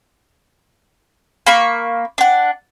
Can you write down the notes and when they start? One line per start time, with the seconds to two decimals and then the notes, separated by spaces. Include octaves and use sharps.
1.46 A#3 B5 C#6
2.18 D4 F#5